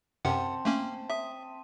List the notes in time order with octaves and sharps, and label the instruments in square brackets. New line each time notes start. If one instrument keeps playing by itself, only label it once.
[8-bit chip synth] F#2 C3 F#5 [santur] C4 A5
[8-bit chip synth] A3 A#3 C#4
[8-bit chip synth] E5 [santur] D#6